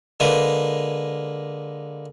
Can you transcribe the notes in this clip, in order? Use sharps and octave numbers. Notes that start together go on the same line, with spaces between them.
D3 G#3 A#3 B4